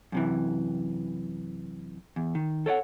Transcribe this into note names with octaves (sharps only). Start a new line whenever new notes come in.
F#2 C3 E3
E2
D#3
A4 C#5 D5 F#5